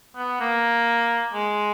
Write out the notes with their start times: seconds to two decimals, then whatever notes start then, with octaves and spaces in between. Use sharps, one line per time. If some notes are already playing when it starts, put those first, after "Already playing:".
0.17 B3
0.41 A#3
1.34 G#3